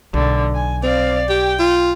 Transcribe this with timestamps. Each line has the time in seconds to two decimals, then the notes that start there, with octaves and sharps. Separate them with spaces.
0.14 B1 D3
0.55 G#5
0.83 C4 D5 F5
1.29 G4 G5
1.59 F4